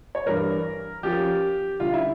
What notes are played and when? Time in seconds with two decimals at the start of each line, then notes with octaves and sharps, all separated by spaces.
0.15 C#5
0.26 G2 E3 G3 D4 A#4
1.03 F3 C#4 F4 G4 A#4
1.80 D2 D3 G3 C#4 F4
1.93 E4